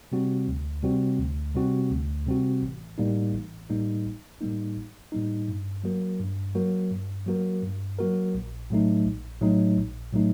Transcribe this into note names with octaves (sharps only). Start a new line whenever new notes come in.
C3 G3 C4 F#4
D2
C3 G3 C4 F#4
D2
C3 G3 C4 F#4
D2
C3 G3 C4 F#4
A1
A2 G3 A#3 D#4
A1
A2 G3 A#3 D#4
A1
A2 G3 A#3 D#4
A1
A2 G3 A#3 D#4
G2
F#3 A#3 F#4 A#4
G2
F#3 A#3 F#4 A#4
G2
F#3 A#3 F#4 A#4
G2
F#3 A#3 F#4 A#4
A#1
A2 F#3 A3 D#4
A#1
A2 F#3 A3 D#4
A#1
A2 F#3 A3 D#4